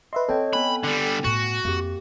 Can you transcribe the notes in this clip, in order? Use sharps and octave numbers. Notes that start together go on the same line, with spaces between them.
B4 D#5 E5 C6
C4 A4 C#5 D#5 G5
B3 G#5 B5 F#6
D3 G3
A2 F#4
F2 A#3 G4